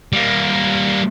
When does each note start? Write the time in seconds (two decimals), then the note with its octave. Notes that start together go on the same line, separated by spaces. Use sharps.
0.13 G3 A#3